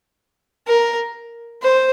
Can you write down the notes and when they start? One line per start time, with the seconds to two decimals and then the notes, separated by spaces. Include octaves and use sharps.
0.67 A#4
1.62 C5